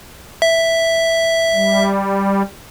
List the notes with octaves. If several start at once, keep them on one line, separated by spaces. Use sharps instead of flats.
E5
G3